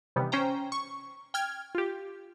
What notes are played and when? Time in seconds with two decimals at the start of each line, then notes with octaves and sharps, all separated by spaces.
0.16 C3 D#3 E3 G3 B3
0.32 C#4 C5 G5 A#5
0.72 C#6
1.34 G5 F6 G#6
1.75 F4 G4